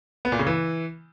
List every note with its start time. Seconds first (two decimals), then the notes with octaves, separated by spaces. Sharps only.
0.25 B3
0.32 A#2
0.39 C#3
0.47 E3